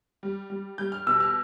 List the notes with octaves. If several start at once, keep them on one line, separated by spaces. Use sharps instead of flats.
G3
G3
G3 G6
F6
B2 E6
F6